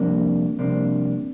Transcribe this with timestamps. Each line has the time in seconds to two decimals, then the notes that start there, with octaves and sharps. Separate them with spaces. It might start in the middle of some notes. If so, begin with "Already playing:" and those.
Already playing: F2 C3 G3 A#3 D4
0.59 F2 C3 G3 A#3 D4